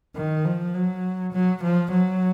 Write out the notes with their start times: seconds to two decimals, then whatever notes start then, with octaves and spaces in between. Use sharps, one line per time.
0.15 D#3
0.45 F3
0.74 F#3
1.33 F#3
1.63 F3
1.91 F#3